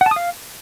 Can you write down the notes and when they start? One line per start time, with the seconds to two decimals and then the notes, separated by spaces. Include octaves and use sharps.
0.01 F#5
0.06 A5
0.11 D#6
0.16 F5